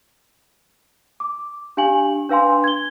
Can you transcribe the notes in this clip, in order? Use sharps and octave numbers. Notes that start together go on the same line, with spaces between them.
D6
D4 G4 F5 G#5 F#7
D4 B4 F5 G#5 C6
G#6 G7